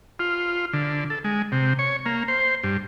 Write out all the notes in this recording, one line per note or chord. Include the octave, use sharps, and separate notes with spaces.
F4
D3
A4
G#3
C3
C#5
A#3
C5
G2